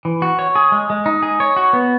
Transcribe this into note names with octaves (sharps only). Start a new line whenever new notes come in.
E3
F#4
C#5
G#4
G#3
G#3
D#4
G#4
C#5
F#4
B3